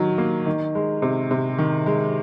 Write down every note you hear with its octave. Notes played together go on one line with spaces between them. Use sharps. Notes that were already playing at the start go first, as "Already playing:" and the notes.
Already playing: D#3 F#3
A#3
D#3
G#3
C3
C3
D#3
G#3